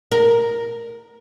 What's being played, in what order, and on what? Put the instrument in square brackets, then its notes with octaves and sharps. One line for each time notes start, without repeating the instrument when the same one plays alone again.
[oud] A#4